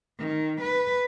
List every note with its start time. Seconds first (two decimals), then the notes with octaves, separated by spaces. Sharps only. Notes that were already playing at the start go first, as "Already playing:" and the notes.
0.19 D#3
0.61 B4